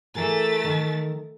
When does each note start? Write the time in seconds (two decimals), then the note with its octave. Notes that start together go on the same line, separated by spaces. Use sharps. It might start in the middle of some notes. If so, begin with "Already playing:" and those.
0.15 E3 A3 G#4 A#4 A6
0.64 D#3 A#4